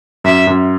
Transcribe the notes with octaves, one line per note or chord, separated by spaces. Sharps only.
F#2 E5
F#2